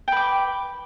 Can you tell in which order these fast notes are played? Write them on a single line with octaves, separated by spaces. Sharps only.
G5 B4 D6